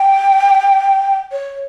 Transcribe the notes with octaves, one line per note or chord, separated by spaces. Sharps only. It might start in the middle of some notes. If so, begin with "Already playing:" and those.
Already playing: G5
C#5